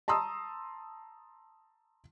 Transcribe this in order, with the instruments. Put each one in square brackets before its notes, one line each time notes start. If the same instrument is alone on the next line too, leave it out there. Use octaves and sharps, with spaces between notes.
[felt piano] A5 A#5 C6 D#6 E6